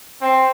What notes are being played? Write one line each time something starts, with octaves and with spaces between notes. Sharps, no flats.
C4